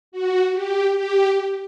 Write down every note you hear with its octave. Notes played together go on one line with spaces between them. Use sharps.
F#4
G4
G4